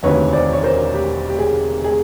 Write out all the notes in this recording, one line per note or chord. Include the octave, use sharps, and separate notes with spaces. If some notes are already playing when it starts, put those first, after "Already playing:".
E1 D2 C3 D#3 B4 C#5
C5 D5
C#5
A#4 C5
G4
G4
G#4
G#4